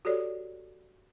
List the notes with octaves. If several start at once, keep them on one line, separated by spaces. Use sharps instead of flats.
F#4 G4 A4 C#5 D5